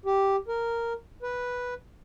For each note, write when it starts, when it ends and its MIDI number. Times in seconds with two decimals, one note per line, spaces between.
0.05 0.36 67
0.48 0.93 70
1.23 1.74 71